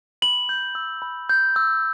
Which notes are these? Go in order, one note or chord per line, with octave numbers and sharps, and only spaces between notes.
B5 F#7
G6
E6
B5
G6
E6